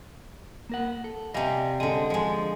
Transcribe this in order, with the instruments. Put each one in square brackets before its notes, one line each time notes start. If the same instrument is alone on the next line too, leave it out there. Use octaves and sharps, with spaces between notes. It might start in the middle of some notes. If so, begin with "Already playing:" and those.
[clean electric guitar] A#3 A#4 F#5
A4
[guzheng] C3 G3 [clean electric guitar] D#5 F5 G#5
[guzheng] D3 G#3 [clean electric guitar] D#5
[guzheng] F3 G#3